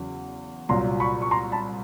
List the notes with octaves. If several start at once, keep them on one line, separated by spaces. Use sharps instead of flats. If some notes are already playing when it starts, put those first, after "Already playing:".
Already playing: E2 C#3 F#3
C2 A#2 F#3 A#5 C6
B5 C#6
C#6
A#5 C6
A5 B5